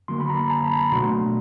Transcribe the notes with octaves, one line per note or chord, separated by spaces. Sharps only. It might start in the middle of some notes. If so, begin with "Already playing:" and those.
D3 F#3 A#3 C6
B5
A#5
A5
B5
A#5
B2 F#3 A3 D4 C6